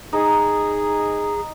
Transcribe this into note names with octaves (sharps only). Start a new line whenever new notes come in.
D#4 G#4